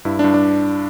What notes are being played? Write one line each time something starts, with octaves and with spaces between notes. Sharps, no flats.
G2 E4
G2 D4
D4